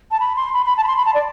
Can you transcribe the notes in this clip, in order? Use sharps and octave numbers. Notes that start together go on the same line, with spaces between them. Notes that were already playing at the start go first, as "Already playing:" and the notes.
A5
B5
C6
B5
B5
A5
B5
C6
B5
A5
D5